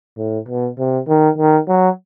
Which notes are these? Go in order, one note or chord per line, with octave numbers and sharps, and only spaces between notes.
A2
B2
C3
D#3
D#3
F#3